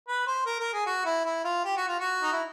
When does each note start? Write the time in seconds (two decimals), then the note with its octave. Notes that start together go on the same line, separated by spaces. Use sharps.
0.08 B4
0.27 C5
0.46 A#4
0.59 A#4
0.73 G#4
0.86 F#4
1.05 E4
1.25 E4
1.44 F4
1.65 G4
1.77 F#4
1.88 F4
1.99 F#4
2.22 D#4
2.33 E4